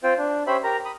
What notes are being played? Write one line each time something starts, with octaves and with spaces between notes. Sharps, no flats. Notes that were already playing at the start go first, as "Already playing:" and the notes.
C4 F4 C5 G5
D4
C#4 G4 C5 E5 B5
G4 A#4 A#5
B5 D#6